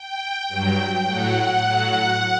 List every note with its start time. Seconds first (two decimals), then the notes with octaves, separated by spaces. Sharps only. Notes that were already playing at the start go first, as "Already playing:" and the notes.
Already playing: G5
0.48 G2 F#3
1.06 A2 F#3 F#5
1.35 F#5
1.64 A2 F#3